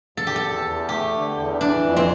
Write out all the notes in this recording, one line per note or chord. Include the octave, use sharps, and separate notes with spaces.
E2 A4
G4
A4
E2
E2
A3 G4
D3
E2
E3 D4
F2
C4